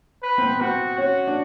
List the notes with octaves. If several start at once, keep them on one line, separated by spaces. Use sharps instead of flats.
B4
C4
B3
C4 F#4
C#4 F#4
D4